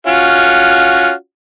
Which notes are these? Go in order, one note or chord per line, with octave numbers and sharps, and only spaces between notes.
C#4 F4 F#4